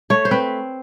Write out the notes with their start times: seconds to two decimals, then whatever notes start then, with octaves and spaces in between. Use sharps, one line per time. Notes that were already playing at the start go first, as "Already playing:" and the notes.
0.10 A3 C#5
0.25 C5
0.31 C4 B4